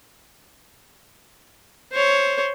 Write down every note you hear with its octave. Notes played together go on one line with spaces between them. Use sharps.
C5 C#5